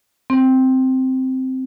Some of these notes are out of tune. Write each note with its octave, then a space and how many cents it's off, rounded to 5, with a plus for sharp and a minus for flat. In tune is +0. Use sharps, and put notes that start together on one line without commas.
C4 -5